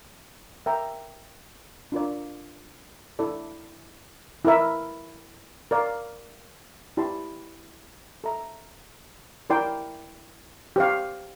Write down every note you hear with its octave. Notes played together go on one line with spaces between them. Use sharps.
A#4 E5 G5 A#5
D4 F4 A#4 D5
E4 A4 D5
E4 A#4 E5
A#4 D5 F5
E4 G4 D5 A5 C6
A4 E5 A#5
E4 A#4 D5 G5 C6
G4 C5 F5